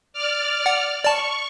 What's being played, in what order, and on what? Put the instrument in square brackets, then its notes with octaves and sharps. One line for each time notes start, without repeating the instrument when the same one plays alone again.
[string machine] D5 F6
[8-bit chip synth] F#5
[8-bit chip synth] D5 A5 [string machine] C#6